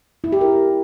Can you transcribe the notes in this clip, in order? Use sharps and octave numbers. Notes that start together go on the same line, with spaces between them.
E4
G4
A#4